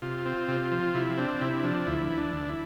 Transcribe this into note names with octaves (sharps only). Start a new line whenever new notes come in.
C3 F4
C4
C3
F3
C3 E4
C4 D4
C3 E4
F3 D4
D2 E4
E3
D4
D2
E4